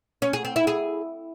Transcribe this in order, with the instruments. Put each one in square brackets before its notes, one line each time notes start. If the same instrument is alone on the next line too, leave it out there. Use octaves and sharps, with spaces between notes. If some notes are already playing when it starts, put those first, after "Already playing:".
[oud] C#4
G#4
C4
E4
G#4